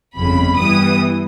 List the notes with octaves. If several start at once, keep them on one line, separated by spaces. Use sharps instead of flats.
G1 F2 C#3 B5
G2 E3 G3 B3 D#6